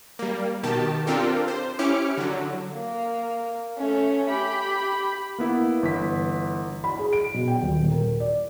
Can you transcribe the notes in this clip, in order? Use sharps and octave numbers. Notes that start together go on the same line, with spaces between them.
G3 A#3
B2 D#3 G4 A5
C4 D4 F4 G4 A4 A#4
C5
C#4 E4 G4 D6 F6 C#7
D3 F#3
A#3
A3 C#4
G4 B5
A#3 B3 E4
G1 E3 B6
B5
G#4
D7
B2
G5
D#1
A#4
D5